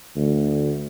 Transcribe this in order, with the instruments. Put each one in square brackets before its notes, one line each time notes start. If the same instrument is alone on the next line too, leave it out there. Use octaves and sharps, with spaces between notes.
[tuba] D2